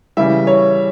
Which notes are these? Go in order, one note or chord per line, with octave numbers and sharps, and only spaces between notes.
C#3 E3 G3 E5
C#5